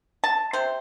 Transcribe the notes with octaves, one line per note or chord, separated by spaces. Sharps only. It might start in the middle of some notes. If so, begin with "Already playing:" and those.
A5
C3 C5